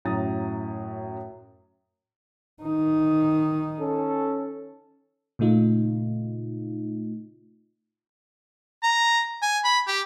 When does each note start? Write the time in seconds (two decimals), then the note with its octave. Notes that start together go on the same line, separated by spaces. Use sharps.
0.05 F#2 A2 A#5 D#6 A6
2.63 D#3 D#4
3.80 C#4 A4
5.39 A#2 C#3 A3 D#4 F4
8.83 A#5
9.42 G#5
9.64 B5
9.87 G4